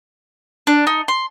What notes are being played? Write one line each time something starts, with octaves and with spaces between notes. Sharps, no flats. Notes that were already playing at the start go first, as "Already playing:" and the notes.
D4
D#4
C6